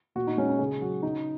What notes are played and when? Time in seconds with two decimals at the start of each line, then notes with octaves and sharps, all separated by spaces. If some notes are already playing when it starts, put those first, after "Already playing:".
0.15 A#2 F#4
0.27 D#4
0.37 G#3 C#4
0.49 D#4
0.59 C#3 G#4
0.81 F#3 F#4
1.03 C#3 D#4